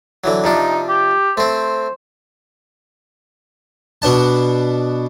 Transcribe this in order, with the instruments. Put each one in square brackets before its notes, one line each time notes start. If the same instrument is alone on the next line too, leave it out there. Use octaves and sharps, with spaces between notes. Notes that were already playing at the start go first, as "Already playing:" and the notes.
[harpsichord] D3 E3 F#3
[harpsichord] C3 F3 D4 [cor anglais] D#4
[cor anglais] G4
[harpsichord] A3 C4 [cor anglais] C5
[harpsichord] B2 B3 D4 A5